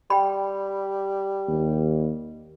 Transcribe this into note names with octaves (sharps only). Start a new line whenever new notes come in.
G3 G5 B5
D#2